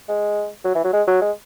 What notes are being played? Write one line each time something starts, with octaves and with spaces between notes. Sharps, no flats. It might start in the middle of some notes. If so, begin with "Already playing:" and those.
G#3
F#3
E3
F#3
G#3
F#3
G#3